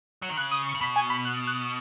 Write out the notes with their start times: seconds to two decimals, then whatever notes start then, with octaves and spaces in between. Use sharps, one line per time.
0.22 F#3
0.30 D#3
0.37 C#3 F#6
0.51 D#6
0.66 C#6
0.75 C#3
0.81 B2 B5
0.96 G#5
1.10 B5
1.25 F#6
1.47 F#6